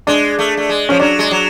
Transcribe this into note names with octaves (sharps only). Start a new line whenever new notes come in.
G#3 D4
A3
A3
G#3
F3 C#4
F#3 D4
G#3
F#3